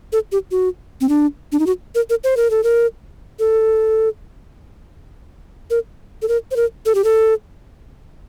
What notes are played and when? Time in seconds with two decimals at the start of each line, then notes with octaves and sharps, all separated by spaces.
0.13 A4
0.32 G4
0.51 F#4
1.01 C4
1.09 D4
1.52 D4
1.59 D#4
1.66 F#4
1.95 A#4
2.10 A#4
2.24 C5
2.37 A#4
2.51 A4
2.64 A#4
3.39 A4
5.70 A#4
6.22 A4
6.28 A#4
6.51 C5
6.56 A#4
6.86 A4
6.95 G4
7.04 A4